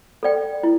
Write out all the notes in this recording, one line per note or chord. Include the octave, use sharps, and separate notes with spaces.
A4 D5 G5
E4